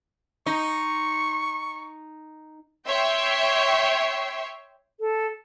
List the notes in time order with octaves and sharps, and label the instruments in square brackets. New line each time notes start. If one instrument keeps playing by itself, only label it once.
[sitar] D#4 [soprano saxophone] C#6
[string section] C#5 E5 G5 C6
[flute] A4